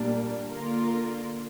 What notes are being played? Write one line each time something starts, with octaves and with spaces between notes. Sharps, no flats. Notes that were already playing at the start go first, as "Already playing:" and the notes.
Already playing: A#2 G3 A#3 D4
D3 A#3 F4 A#4